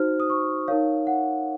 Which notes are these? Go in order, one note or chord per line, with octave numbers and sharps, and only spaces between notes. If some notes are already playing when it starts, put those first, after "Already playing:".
Already playing: D#4 F#4 C5 F6
D#6
C#6
D#4 A#4 C#5 F5
F#5